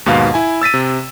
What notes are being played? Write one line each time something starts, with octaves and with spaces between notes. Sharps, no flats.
D#2 G#2 B2 B4 F5
E4 G#5
E6 A6 B6 D#7
C3